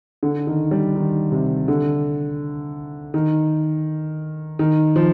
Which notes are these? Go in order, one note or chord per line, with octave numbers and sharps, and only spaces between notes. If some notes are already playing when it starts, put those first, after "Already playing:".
D3
D#3
G3
D#3
C3
D3
D#3
D#3
F3